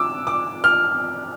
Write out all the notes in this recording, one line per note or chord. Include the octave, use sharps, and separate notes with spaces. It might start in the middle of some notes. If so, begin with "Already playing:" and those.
Already playing: D6 E6
D6
F6